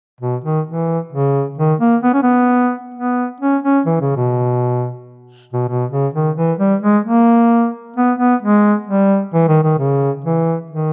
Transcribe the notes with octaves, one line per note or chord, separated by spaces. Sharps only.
B2
D#3
E3
C#3
D#3
A#3
B3
C#4
B3
B3
C#4
C#4
E3
C#3
B2
B2
B2
C#3
D#3
E3
G3
G#3
A#3
B3
B3
G#3
G3
E3
D#3
D#3
C#3
E3
D#3